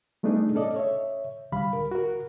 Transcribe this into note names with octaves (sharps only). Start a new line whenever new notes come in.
G3 A3 B3 D4 D#4 G#4
C#4 A4 D5 D#5
C#5 E5
C#2 D3 G3 F5 B5
A#4
F#4 A#4